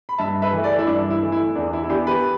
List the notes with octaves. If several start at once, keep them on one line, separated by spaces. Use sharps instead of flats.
B5
G2 E5 A5
B4 E5
E3 A3
A4 D5
E4
G2 D4
E4
E3 A3
E4
E2 D4
E4
E4
E3 B3 D4 G4
G4 B4